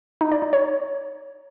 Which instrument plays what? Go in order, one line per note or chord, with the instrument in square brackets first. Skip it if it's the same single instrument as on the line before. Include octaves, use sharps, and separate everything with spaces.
[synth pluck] D#4
D5
D#4
C#5